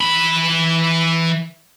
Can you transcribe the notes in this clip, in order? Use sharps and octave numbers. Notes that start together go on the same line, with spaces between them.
E3 B5